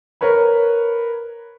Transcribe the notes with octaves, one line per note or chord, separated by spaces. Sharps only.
A#4 B4 C#5 B5